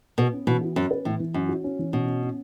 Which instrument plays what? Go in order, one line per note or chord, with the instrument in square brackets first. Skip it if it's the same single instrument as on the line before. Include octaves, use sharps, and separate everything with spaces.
[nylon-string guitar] B2 [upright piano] B4
[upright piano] C#4
[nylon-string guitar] B2 [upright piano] E3
[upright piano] F#4
[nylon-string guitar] F#2 [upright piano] C#4
[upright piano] B4
[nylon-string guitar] A2 [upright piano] E3
[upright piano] E3
[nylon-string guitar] F#2 [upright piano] C#4
[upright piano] F#4
C#4
E3
[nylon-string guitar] B2 [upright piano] C#4
[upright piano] C#4
C#4